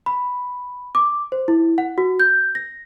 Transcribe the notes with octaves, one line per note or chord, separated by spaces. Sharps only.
B5
D6
C5
E4
F#5
F#4
G6
A#6